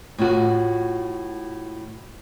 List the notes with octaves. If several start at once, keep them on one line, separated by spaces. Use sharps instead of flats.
A2 F4 F#4